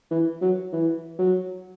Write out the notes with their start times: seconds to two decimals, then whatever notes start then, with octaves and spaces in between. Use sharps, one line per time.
0.11 E3
0.42 F#3
0.72 E3
1.19 F#3